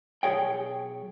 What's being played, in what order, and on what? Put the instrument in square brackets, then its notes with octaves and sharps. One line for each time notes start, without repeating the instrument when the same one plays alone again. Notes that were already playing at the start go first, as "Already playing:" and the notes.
[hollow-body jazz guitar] B1 F#2 G#4 C#5 G5